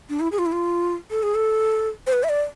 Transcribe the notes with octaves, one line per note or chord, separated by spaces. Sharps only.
D4
E4
G#4
F4
E4
F4
A4
G#4
A4
C5
B4
E5
D5